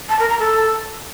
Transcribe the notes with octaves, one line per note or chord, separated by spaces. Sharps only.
A5
A#4
A#5
A4